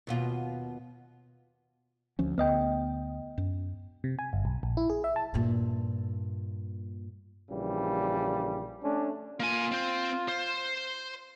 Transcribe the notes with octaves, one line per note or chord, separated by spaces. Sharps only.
D#2 B2 F4
D2 F3 C#4
D2 B3 D#5 G5
F#2
C3
G#5
G1
B1
A#1
E4
G#4
E5
A5
G2 A#2
A#1 C#3 E3 G3
A3 C#4 D4
A#3 F4 G#5
C4 C5
C5